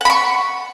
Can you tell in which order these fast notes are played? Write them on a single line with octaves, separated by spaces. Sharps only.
F#5 B5 C#6